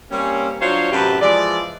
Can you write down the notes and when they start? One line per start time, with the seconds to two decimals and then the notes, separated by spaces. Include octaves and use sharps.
0.11 G3 A#3 C4 C#4
0.61 F#3 D4 F4 C5 C#5
0.92 F#2 A2 C3 G4 B4 A5
1.21 E3 F3 G#3 D5